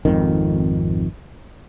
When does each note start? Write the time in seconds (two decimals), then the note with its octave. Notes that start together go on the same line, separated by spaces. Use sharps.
0.05 G#1 F2 D#3